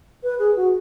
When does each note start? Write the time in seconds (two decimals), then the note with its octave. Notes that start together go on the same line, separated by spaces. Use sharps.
0.23 B4
0.39 G#4
0.56 F#4